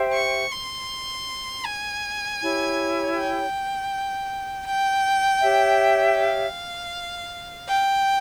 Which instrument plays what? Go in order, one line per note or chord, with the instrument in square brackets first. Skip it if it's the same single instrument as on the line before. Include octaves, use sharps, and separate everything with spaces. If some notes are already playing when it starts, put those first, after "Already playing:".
Already playing: [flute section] G4 C5 E5 G5
[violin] C#6
C6
G#5
[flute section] E4 G4 C#5
[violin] G5
G5
[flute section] G4 C#5 E5
[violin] F5
G5